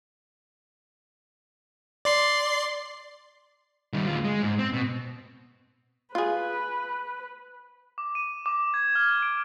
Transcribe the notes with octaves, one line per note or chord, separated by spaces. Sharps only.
D5 C6 C7
D#3 G3
D2 F4
G#3
G#2
C4
B2
F4 G#4 B4
D6
D#7
D6
G#6
F6
D7